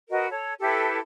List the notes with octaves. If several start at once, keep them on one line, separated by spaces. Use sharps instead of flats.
F#4 A#4 B4 D#5
A4 C#5
E4 G4 A4 B4